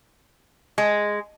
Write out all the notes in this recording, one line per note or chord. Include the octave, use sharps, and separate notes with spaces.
G#3